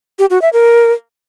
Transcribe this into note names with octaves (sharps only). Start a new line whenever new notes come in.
G4
F#4
E5
A#4